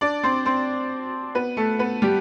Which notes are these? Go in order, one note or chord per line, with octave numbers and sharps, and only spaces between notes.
D4 D5
C4 C5
C4 C5
B3 B4
A3 A4
B3 B4
G3 G4